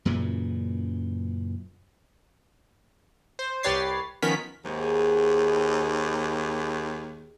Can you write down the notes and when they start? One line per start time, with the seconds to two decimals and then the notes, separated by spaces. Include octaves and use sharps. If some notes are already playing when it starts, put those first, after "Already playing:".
0.05 F#2 A#2 C#3 E3
3.39 C5
3.63 C2 G4 B4 C#5 A6 C7
4.22 D#3 F3 B3 C#4 A#4 B6
4.65 D#2 G#2